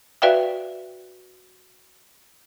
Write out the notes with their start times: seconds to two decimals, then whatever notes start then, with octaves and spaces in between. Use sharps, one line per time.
0.22 F#4 B4 D5 E5 F5 G5